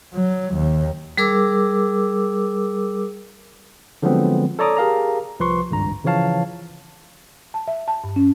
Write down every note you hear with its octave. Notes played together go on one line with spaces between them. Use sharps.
F#3
D#2
G3 G#4 A#4 D6 E6
D3 F3 F#3 G#3 B3 C4
A4 C#5 D5 A#5 D6 D#6
G4 G#4 A#4 F5 A5 A#5
C2 F3 B4 C6 C#6
G#1 C#2 G2 A#5
C#3 E3 F3 C#5 F5 A5
A5
E5
A5
G2
C#4